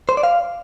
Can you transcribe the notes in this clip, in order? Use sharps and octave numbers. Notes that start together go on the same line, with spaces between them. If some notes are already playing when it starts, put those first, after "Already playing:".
C5
D5
F5